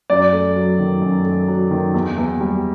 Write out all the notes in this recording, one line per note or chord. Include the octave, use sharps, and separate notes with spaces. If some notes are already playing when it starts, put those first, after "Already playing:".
F#2 D5
A3
F#3
D#3
F#2
A3
F#3
D#3
E2
E2
G3